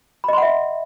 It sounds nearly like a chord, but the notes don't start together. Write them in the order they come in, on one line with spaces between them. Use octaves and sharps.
B5 D#5 C6 F#5 E5